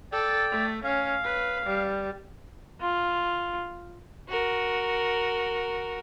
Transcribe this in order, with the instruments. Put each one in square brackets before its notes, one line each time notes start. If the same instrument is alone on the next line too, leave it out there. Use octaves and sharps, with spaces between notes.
[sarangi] A4 [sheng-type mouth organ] D5 G5
[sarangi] A3
[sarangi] C#4 [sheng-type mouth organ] F5
[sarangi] B4
G3
[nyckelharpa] F4
[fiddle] F#4 A#4